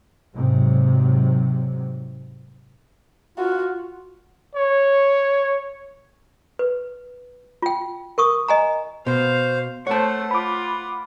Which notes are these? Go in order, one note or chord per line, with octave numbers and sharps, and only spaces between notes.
G#2 C3 F#3
F4 F#4
C#5
B4
F4 G5
A#4 C#6 D#6
D#5 G#5 A#5
B2 C5 F5
A3 C5 C#5 F#5 A5
F4 B5 D6